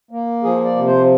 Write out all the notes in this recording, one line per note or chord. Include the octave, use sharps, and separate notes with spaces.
A#3
F3 G#4
D5
C3
C5